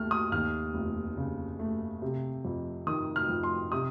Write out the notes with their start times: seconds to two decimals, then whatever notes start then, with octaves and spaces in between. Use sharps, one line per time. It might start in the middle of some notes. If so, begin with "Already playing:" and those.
Already playing: D#2 A3 F6
0.11 D#6
0.32 D#2 F6
0.74 F1
1.17 C#3
1.59 A3
2.02 C3
2.45 F2
2.87 D#3 D#6
3.16 F6
3.29 F2
3.43 C6
3.72 C3 D#6